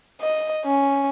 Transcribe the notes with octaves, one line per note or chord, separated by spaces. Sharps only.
D#5
C#4